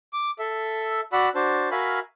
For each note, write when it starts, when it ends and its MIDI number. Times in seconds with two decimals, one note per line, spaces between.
0.13 0.31 86
0.39 1.01 69
0.39 1.01 76
1.13 1.29 66
1.13 1.29 74
1.13 1.29 78
1.13 1.29 83
1.13 1.29 88
1.35 1.69 62
1.35 1.69 66
1.35 1.69 72
1.35 1.69 81
1.71 1.99 66
1.71 1.99 70
1.71 1.99 76
1.71 1.99 77
1.71 1.99 80
1.71 1.99 83